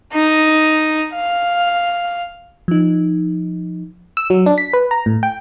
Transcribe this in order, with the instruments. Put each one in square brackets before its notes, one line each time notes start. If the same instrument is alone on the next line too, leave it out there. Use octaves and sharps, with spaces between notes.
[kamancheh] D#4
F5
[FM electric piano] F3 D#4
E6
F#3
D4
B6
B4
A#5
A2
G5